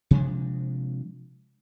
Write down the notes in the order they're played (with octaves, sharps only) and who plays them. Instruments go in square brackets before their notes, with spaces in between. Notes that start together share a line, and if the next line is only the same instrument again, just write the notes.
[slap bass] C3 F3 G#3 D4